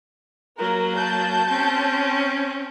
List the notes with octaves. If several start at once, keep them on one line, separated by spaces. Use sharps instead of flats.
F#3 A#3 A#4
A5 G6
C4 C#4